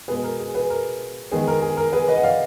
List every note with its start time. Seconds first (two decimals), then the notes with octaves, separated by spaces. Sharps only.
0.08 B2 G#3 B3 G#4 B4
0.24 A#4
0.40 G#4
0.55 G#4 B4
0.70 A#4
1.32 D#3 G#3 B3 G#4
1.48 A#4
1.62 G#4
1.77 A#4
1.93 G#4 B4
2.08 B4 D#5
2.16 F#5
2.23 D5 F5